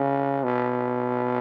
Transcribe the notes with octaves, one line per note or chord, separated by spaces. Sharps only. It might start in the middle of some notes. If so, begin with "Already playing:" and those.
Already playing: C#3
B2